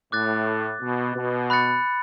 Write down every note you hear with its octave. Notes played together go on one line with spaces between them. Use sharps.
A2 D6 F#6 A6
B2
B2
B5 F#6 A6 C#7